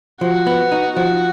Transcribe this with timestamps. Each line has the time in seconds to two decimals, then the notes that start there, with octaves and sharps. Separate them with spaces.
0.21 F3 F#4
0.47 B3
0.72 D#4
0.96 F3 F#4